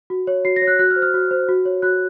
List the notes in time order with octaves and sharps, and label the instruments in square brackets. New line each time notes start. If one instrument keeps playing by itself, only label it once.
[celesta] F#4
C#5
F#4 C7
A#6
C#5
F#6
F#4 F#6
F6
C5
F6
F#4
C5
F#4
C#5
F#4 F#6